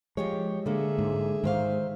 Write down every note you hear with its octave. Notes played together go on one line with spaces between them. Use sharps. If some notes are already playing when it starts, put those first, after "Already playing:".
F3 G#3 G4 C#5
D3 A#3 G#4 E5
G#2
G#2 D#3 C5 F5